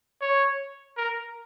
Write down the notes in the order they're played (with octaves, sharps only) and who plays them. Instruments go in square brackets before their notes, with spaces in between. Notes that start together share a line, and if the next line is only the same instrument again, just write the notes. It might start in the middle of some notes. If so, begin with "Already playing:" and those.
[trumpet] C#5
A#4